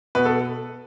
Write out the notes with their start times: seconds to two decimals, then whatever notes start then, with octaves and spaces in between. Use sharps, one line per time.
0.15 B2 B4
0.25 A4